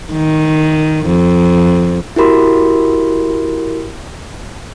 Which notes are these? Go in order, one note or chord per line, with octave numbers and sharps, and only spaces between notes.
D#3
F2
E4 F#4 G4 A#4 B5 C6